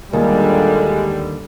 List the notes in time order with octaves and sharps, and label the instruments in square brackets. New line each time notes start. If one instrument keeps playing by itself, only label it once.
[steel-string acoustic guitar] D#2 [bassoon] A#2 [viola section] D3 G3 [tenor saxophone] G#3